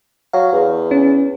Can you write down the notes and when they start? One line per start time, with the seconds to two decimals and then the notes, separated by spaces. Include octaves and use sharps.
0.33 F#3 F5
0.52 E2
0.91 C#4